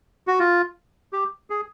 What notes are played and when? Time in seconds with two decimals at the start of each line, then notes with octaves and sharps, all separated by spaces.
0.27 F#4
0.40 F4
1.13 G4
1.50 G#4